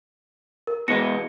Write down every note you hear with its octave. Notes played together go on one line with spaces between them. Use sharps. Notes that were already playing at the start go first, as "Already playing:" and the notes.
A#4
B2 E3 G#3 A#6 C#7